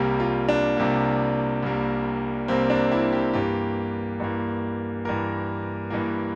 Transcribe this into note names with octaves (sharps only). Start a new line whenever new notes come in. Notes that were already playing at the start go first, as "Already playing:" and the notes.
Already playing: C2 C3 G3 A#3
F4
D4
C2 C3 G3 A#3
C2 C3 G3 A#3
C2 C3 G3 A#3 C4
D4
E4
G4
G2 E3 A#3 G4
G2 E3 A#3
G2 E3 A#3 A#4
G2 E3 A#3